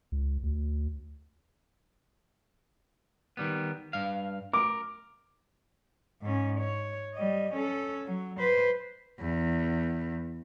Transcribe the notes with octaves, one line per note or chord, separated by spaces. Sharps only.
C#2
D2
D#3 G3 B3
G2 F5
A#4 D6
G#2 C#4
C#5
G3 D#5
C#4 A4
F#3
B4 C5
E2